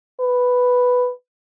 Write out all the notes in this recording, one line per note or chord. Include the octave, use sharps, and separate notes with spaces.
B4